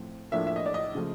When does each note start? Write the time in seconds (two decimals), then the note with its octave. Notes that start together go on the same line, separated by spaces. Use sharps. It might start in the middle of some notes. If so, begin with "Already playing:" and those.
Already playing: A2 F3 A3 C4
0.32 A2 F3 A#3 D4 E5
0.47 E5
0.56 D#5
0.66 D5
0.74 D#5
0.95 C#3 F3 A3